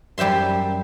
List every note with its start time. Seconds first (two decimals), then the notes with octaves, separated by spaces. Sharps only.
0.18 F#2 G3 C5 E5 C6